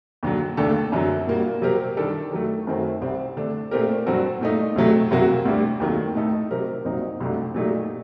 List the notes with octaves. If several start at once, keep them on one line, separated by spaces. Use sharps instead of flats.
D#2 D3 F#3
D#2 D3 A3 D4 A4
F#2 D3 F#3
A#2 G3 A#3 F#4
C3 F#3 C4 G4 A#4
D#3 G3 D4 A4
D#3 F#3 A3
F#2 D#3 A3 C4 F#4
C2 C3 G3 C4
D3 A3 D4 A4
A#2 A3 C4 G4 A#4
G2 F#3 C4 F#4 A4
A#2 A3 D#4
D2 C3 F#3 A3
C2 C3 F#3 A#3 F#4
D2 C3 G3 D4 G4
D#2 D#3 F#3 A3
A2 A3 D#4 A4
C3 F#3 C4 G4 A#4
C2 A#2 F#3 C4 D#4
C2 C3 F#3 A3 D4
A#2 F#3 A3 D#4 G4